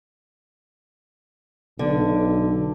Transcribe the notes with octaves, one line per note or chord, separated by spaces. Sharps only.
B1 D3